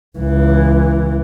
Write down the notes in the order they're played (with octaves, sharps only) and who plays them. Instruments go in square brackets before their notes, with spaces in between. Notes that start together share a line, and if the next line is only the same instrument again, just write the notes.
[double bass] C#2 E3